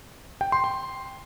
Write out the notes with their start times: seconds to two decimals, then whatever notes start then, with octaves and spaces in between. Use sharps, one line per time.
0.41 G5
0.52 C6
0.64 C6